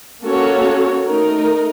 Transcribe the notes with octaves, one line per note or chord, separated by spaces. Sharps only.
A#3 C#4 F#4 A4 C#5
A3 D#4 A#4